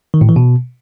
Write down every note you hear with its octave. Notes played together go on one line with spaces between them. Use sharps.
D#3
A2
E3
B2